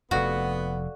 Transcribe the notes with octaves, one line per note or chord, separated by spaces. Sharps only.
F1 F2 B3 F#4 A4 D5 F5